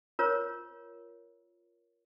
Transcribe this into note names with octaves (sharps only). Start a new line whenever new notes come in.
F4 A#4 C5 C#5